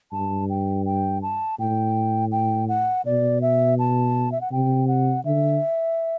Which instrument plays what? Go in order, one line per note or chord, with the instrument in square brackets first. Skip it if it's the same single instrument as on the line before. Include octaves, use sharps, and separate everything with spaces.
[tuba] G2 [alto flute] A5
[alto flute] G5
G5
A5
[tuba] A2 [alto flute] G5
[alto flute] G5
F#5
[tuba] B2 [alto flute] D5
[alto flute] E5
A5
E5
F#5
[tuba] C3 [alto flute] G5
[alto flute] F#5
[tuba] D3 [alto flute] E5